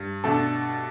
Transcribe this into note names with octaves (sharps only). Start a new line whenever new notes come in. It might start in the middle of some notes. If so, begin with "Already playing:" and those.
Already playing: G2
B2 A3 D4 A4